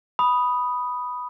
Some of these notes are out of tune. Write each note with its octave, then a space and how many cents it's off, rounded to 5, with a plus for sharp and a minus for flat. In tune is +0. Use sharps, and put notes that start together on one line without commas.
B5 +0 D#6 +0